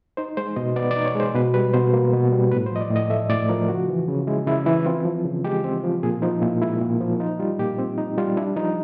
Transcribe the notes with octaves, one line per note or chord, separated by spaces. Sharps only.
D#4 C5
G#3 C5
B2 D#5
B3 D5
D5
D#4
C#5
G#3
C5
B2 B4
G3 B4
B2 C5
A#3
B2
G3
A2 B4
C5
F3 D#5
D5
A2
D#5
A3 E5
A2 D5
F3 A#4
C#3 F#4
E3
C#3
G#3 E4
C#3 E4
E3 E4
C4 F4
F3
C#3
G#3 G4
C4
F3
A#2 G#4
F3 D#4
A#2 E4
G#3 E4
A#2
F3
D#4 F4
G3 F4
A#2 G4
C4
D#4
G3 F4
D4 E4
F3 D#4